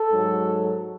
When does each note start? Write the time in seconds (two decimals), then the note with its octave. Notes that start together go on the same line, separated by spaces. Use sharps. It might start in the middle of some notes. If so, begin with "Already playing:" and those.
Already playing: A4
0.11 G#2 F#3